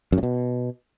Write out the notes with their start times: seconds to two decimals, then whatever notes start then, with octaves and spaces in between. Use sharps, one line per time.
0.12 F#2
0.18 A2
0.23 B2